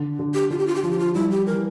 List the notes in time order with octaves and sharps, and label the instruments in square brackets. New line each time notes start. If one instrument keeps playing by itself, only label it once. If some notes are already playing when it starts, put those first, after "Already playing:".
Already playing: [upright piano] D3
D3
[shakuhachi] G4
[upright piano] D3 [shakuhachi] F4
[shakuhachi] G4
F4
G4
[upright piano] F3 [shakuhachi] F4
[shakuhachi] G4
F4
[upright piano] G3 [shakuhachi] E4
[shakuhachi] G4
[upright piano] E3 [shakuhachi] A#4